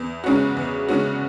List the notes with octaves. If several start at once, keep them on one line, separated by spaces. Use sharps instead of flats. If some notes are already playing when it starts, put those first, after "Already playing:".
Already playing: E2
C#3 G#3 C#4 F#4
E2
C#3 G#3 C#4 F#4